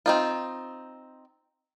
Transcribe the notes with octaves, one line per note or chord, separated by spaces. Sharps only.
C4 D#4 F4